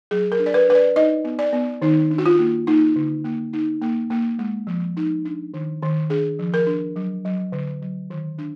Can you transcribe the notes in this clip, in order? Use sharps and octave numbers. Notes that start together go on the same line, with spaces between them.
F#3 G#4
A#4
D4
D5
B4
D4 B4
D5
D#4 D#5
B3
D5
B3
D#3 D#4
D4
F#4
F4
A#3
A#3 D#4
D3
A#3
D#4
A#3
A#3
G#3
F3
D#4
D4
D#3
D#3
D4 G#4
F3
A#4
D4
F#3
F#3
D3
F#3
D#3
D4